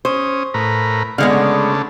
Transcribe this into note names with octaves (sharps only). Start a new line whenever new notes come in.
C#4 C5 D#6
A2 A#4 B4
D3 G#3 B3 F4 F5 F#5
C#3 A3 D4